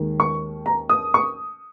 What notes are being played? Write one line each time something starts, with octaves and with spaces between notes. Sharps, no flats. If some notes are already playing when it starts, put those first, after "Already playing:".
Already playing: D#2 D#3 G#3
C#6
A#5
D#6
C#6